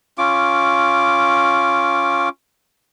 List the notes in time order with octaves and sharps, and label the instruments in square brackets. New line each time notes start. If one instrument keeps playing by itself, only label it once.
[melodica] C#4 F4 D6